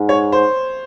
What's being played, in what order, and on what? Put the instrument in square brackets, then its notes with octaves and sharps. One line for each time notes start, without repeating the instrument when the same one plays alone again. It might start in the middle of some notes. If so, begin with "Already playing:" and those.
Already playing: [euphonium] G#2
[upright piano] C#5
C5